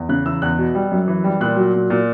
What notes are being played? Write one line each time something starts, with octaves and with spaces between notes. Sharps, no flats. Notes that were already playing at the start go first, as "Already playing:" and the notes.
Already playing: E2
C#3 F#6
E3 E6
E2 F#6
B2
G3
F#2
E3
G3
A#2 F#6
F#3
A#2
A#2